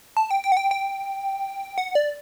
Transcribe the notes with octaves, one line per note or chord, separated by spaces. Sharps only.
A5
G5
G5
F#5
G5
G5
F#5
D5